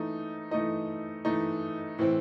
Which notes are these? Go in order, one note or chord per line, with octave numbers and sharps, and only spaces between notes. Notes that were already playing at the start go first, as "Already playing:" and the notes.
Already playing: E3 A3 D#4
E3 A3 D#4 D#5
E3 A3 D#4
A2 E3 C4